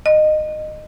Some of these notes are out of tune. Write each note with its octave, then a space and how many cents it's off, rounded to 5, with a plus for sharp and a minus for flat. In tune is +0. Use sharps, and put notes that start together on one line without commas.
D#5 -20